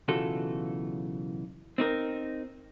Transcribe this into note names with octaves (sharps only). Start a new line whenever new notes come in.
B1 C#3 E3 F4 F#4 A4
C4 D#4 A#4